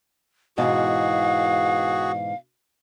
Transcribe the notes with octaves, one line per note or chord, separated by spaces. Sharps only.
G#2 B2 E3 F#4 G#4 F5